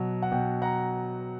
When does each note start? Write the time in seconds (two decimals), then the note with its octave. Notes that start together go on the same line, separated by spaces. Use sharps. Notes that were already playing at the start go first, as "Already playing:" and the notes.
Already playing: B2 F#3
0.22 F#5
0.32 B2 G5
0.62 F#5 A#5